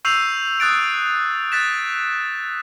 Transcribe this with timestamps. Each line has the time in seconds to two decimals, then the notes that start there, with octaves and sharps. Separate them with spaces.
0.05 C#6 E6 G6 C7 D#7 F7
0.60 D#6 F#6 A6 D7
1.52 F#6 A6 B6 E7